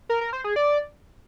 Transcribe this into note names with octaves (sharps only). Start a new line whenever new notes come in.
A#4
A#4
C5
G#4
D5